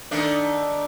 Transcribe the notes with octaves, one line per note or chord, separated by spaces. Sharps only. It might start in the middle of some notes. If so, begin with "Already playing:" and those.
D#3 A3 D4